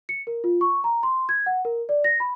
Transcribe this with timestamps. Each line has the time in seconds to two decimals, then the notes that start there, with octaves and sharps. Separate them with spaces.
0.09 C#7
0.27 A#4
0.44 F4
0.61 C#6
0.84 A#5
1.03 C6
1.29 G#6
1.46 F#5
1.65 A#4
1.89 D5
2.04 A#6
2.20 B5